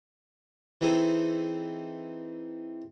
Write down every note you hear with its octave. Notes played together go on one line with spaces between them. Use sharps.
E3 C4 D#4 G#4 A4